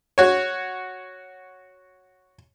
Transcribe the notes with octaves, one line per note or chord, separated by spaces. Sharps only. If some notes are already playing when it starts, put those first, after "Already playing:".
F#4 C#5